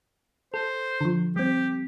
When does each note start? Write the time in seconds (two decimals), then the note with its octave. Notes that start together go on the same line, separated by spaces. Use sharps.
0.54 A4 C5
1.01 D3 F3
1.36 G3 C4 G4